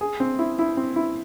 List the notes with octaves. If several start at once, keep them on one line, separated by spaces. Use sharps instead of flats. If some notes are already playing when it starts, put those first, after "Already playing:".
G#4
C4
E4
E4
C4
E4